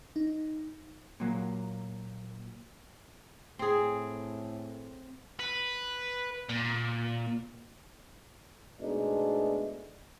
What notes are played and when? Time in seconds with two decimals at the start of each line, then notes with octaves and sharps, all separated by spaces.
0.16 D#4
1.20 A#2 F#3 A#3
3.59 A2 C4 G#4
5.39 B4
6.49 A#2
8.80 G#2 B2 G#3 A3 D4 D#4